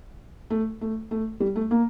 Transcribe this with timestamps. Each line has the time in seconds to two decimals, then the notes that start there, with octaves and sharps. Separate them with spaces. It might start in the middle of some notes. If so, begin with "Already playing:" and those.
0.50 A3
0.81 A3
1.11 A3
1.40 G3
1.56 A3
1.71 A#3